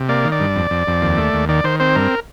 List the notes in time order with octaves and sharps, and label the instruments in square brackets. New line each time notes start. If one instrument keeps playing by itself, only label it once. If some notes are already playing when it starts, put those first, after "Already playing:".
Already playing: [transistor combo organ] C3
A#3 D5
D#3
D5
G2
F2
F2
F2
D#2
A3
D#2
D#3 D5
D#3 C5
C4 C5
G2 A#4